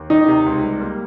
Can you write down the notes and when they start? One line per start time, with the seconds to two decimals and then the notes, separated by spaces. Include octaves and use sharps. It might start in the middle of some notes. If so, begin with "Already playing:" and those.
Already playing: D#2
0.10 D#3 D#4
0.28 C3
0.46 C#2
0.63 G3
0.81 A#3